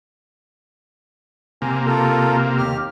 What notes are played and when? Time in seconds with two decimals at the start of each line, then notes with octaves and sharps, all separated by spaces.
1.62 C3 A#3 G#5
1.86 F4 A4 A#4
2.58 D#2 G4 F6